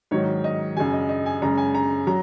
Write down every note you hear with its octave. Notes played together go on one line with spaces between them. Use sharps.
G#2 D#3 F#3 C#5
D#5
F#2 C#3 F#3 G#5
D#5
D#5
G#5
F#2 C#3 G#3 A#5
G#5
A#5
F#3 A#5